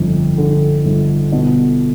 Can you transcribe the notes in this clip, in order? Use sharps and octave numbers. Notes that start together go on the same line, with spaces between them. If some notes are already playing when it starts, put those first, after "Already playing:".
Already playing: G1 F2
D3
G1
B2